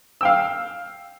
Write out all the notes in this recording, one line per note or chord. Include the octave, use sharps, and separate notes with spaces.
F5 G5 E6